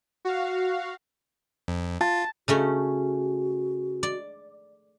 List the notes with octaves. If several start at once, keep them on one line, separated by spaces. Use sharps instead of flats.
F#4 F5
F2
F4 A5
C#3 A3 C#4 F#4
D5